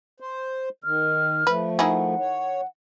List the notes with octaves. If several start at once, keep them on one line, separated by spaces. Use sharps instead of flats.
C5
D#3 F6
F3 A3 B4
D#3 E4 G#4 F#5
C#5